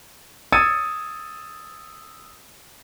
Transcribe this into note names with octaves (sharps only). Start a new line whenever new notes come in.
D#6 E6 G#6 A6 C#7 D#7